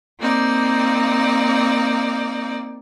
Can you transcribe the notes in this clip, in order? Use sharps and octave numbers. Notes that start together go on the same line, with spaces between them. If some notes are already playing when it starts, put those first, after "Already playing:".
A#3 C4 D#4 D5